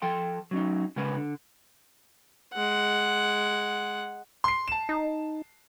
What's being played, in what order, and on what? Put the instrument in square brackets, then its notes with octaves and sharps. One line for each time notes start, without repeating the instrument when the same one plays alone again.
[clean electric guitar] F3 A4 G5 C6
F#3 C#4 D#4
C#3 G#3 C#4 A#4 B4
D3
[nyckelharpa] G#3 F#5
[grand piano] C6 C7
A5 E7
[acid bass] D#4